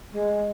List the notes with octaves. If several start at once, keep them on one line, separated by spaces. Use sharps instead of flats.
G#3